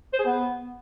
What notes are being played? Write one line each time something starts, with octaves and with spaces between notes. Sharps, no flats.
C5
G#4
B3